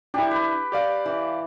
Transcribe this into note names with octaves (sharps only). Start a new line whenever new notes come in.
D4 E4 G4
B4
G4 D5 F5
E3